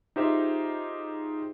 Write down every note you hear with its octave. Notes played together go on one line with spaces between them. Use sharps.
D#4 F4 G4 G#4 C5 E5